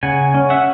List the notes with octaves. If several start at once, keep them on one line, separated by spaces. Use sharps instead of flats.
C#3 F#5 G#5
C#4
E5 F#5